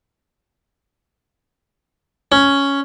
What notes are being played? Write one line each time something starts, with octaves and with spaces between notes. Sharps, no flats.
C#4